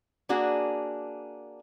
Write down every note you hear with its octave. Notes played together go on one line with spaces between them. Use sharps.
A#3 D4 F#4 G#4